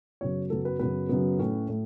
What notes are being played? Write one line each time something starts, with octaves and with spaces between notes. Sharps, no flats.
F#2 C#3 F#3 B3 C#5
F#2 C#3 F#3 B3 A4
B4
F#2 C#3 F#3 B3 B4
F#2 C#3 F#3 B3
A2 A3 C#4
A2 A3